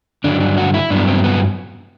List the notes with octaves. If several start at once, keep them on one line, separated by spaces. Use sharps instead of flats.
G2 D3 F#3 D4
D4
F#4
E4
G2 F#3 B3 D4
C4
B3